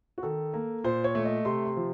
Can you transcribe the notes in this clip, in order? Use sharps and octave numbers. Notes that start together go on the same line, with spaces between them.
F#4
D#3 A4
A#3
A#2 C5
C#5
A3
D#5
C3 C6
C6
F3